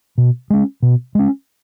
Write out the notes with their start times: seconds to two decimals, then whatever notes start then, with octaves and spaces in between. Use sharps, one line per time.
0.18 B2
0.50 G#3 C#4
0.82 B2
1.15 G#3 C#4